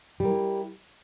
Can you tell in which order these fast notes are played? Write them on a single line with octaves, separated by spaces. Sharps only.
G3 A#4 E4